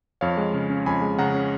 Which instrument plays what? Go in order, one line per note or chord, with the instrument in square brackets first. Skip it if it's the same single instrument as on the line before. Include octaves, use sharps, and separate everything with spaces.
[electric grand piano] F2 C#5 F5
G#3
C#3
C#4
F2 G#5 B5
G#3
C#3 F#5 A#5
C#4